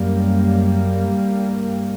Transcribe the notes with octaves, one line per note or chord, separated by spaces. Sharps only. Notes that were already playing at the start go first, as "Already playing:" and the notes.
Already playing: F#2 G3 A#3
G2